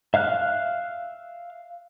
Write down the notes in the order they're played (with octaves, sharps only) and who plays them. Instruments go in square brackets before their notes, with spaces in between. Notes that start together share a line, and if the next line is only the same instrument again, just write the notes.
[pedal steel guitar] E5 F5 F6 F#6